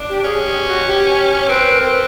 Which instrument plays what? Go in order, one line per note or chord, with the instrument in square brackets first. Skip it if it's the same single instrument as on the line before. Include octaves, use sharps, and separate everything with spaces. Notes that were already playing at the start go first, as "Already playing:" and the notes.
Already playing: [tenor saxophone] D4
[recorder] G4
[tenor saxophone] C#4 [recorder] G#4
[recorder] G4
F#4
G4
[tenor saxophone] C4 [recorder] B4
[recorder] A#4
[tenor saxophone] C4
[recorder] B4